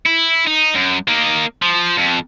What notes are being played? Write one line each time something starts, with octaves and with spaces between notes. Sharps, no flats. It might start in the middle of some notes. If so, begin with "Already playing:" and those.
E4
D#4
F#2
A#3 D#4
F3
F2